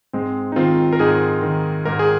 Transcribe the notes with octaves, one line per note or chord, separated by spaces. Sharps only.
G#2 G#3 C4
D#4
D#3 C4 F4
A#4
G#2 D#4 G#4
D#3
G#2 A#4
G#4